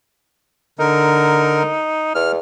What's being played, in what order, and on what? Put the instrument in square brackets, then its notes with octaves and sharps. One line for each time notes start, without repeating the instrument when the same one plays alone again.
[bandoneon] D3 A#4 [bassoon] D#4
[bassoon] E2 [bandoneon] F6